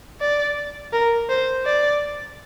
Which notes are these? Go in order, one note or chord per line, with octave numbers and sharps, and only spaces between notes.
D5
A#4
C5
D5